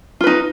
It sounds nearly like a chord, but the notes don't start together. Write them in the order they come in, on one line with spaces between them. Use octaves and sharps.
F4 B4 D#4